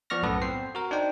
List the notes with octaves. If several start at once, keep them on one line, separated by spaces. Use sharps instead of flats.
F3 B3 D5 C#6 F6 A#6
B1 F#2 A2 B3 A4 F#5
C4 C5 C7
F#4 A#4
D4 D#4 C5 D5 G5